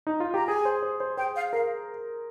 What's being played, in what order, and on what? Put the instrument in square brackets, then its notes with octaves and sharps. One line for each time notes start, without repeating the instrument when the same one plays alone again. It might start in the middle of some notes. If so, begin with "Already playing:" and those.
[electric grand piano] D#4
F4
[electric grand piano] G4 [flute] A#5
[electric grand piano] G#4 [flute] G#5
[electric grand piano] C5
C5
C5
[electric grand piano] C5 [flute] G5
[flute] F5
[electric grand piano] A#4 [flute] F5